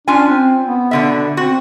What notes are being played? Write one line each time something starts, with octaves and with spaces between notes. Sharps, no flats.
C#4 D4 F4 G#5
C4
B3
B2 D3 E5
C4 F#4